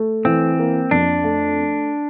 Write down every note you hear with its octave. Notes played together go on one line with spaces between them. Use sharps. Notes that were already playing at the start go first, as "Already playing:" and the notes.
Already playing: A3
E3 C4
A#3
F2 D4
A3